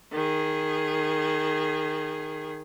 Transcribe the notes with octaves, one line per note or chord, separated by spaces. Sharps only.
D#3 G#4